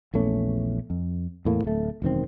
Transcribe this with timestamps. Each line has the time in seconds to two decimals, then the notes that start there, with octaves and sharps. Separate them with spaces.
0.14 A#1 E2 A3 C#4
0.90 F2
1.45 E2 A2 A#3
1.64 D1 A3
2.02 E1 F#2 D#3 C4